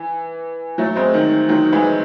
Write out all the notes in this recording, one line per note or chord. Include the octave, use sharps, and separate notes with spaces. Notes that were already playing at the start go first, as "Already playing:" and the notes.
Already playing: E3
F#3 A3
G#3 C4
D#3
D#3 F#3
E3 G#3